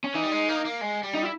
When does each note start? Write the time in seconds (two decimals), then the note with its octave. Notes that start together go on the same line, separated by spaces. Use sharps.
0.04 C#4
0.14 E3 D#4
0.23 G3
0.31 G#3
0.48 A#3
0.65 A#3
0.81 G#3
1.03 G3
1.14 D#4
1.23 E4